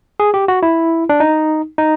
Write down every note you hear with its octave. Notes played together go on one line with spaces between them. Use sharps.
G#4
G4
F#4
E4
D4
D#4
D#4